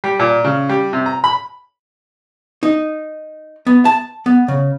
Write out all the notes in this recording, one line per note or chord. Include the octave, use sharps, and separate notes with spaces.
G3
A#2
C#3
G3
C3
A#5
B5
D#4
B3
A5
B3
C#3